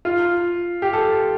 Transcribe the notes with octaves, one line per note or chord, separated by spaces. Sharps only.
F4
G4
A4